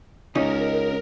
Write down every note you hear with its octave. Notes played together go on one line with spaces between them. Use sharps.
C#2 C#4 D#4 A#4